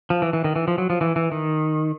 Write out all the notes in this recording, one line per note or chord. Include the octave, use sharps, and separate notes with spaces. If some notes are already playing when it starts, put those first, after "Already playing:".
F3
E3
E3
D#3
E3
F3
F#3
F3
E3
E3
D#3